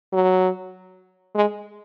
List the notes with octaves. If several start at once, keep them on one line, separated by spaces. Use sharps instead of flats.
F#3
G#3